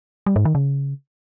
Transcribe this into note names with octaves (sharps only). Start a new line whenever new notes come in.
G3
G#2
D#3
C#3